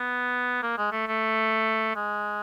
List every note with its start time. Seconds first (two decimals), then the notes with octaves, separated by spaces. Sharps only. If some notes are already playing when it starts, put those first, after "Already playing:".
Already playing: B3
0.62 A#3
0.78 G#3
0.92 A3
1.07 A3
1.96 G#3